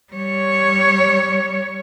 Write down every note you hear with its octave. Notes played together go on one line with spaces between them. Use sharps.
G3 C#5